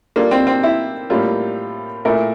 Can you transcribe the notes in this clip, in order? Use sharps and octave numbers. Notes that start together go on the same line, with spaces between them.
G3 A#3 D4 F4 A4
C4
C4
E4
A2 G3 A#3 F4
A#2 A3 E4 A#4